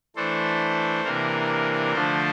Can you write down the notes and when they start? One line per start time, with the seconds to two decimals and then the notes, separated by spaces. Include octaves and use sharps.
0.16 E3 A3 D4 A4 C5
1.04 C3 E3 A#3 D4 A#4
1.93 D3 F3 A3 D4 A4 C5